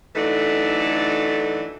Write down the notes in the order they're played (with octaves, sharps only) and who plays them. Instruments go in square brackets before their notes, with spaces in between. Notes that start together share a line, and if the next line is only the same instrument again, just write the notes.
[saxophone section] E3 F#3 A3 D4 D#4 A4